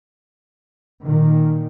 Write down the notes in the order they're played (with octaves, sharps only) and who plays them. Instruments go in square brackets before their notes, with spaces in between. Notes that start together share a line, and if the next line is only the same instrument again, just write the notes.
[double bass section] A#2 D#3